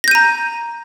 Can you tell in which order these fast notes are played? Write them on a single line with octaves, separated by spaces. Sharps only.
A#6 G6 D#7 A#5